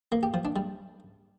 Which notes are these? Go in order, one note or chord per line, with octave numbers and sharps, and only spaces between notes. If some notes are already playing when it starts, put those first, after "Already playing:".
A#3
G4
F3
D4
G3